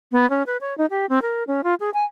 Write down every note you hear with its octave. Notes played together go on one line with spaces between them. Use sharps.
B3
C#4
B4
C#5
D#4
G4
C4
A#4
C#4
F4
G#4
G#5